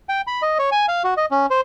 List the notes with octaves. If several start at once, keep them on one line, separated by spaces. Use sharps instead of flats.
G5
B5
D#5
C#5
G#5
F5
F#4
D#5
C#4
C5